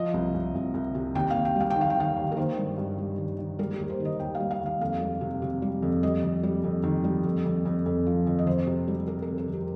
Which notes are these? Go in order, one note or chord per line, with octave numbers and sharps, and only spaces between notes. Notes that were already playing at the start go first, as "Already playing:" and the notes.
Already playing: F3 D#5
C2
C2
C2
C2
C3
D#2 G5
F5
D#2
G5
G3 F5
G5
D#3
F5
G5
D#3 F5
D#2
A#4
D#3 C5
G2
G2
G3
D#3
D#3
G3 A#4
D#2 G4
C5
D#3
D#5
D#2 G5
F5
G3
F5
D#2 F5
F2 F5
G3
C3
C3
G3
F2
G3 D#5
F2
G3
F2
D#3
G3
F2
F2
F2
F2
F3
F2
D#5
F2 C5
C3
G3
G3 A#4
A#4
F2
A#4
F2
G4